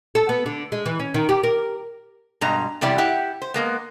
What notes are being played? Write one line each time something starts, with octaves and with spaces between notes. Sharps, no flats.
A4
B3
D3
G#3
E3
C#4
D#3
G4
A#4
G2 B2 G#3 A#5
E2 C3 G3 E4 G4 D5
E4 G4 F#5
C5
G#3 A#3 B3